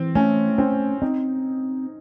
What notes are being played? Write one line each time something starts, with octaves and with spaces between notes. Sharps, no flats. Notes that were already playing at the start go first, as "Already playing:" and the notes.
Already playing: E3 C4
A3 C#4
C4 C#4
C4 D#4